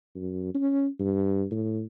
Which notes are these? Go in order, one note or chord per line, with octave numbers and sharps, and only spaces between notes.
F#2
C#4
G2
A2